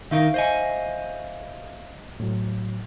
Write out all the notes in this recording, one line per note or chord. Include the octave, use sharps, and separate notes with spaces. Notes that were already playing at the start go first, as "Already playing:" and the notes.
D#3 D#4 A#4 E5 F5 C#6
C5 D#5 G#5
A2 F#3